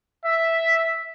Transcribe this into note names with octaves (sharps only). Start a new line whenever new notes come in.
E5